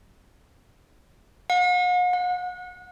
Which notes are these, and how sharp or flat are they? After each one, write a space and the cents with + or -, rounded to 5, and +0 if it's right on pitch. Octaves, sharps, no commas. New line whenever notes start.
F#5 -45
F#5 -30